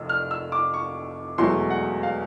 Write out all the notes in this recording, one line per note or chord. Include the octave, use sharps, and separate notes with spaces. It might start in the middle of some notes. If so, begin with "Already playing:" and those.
Already playing: F1 F2 E6
F6
E6
D6
C#6
E1 E2 B2 F#3 A3 C6
F#5
F5